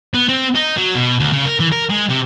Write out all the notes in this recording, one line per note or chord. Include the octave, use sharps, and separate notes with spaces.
B3
C4
D#4
F#3
B2
D2
C#3
A#4
E3
A#4
G#3
C3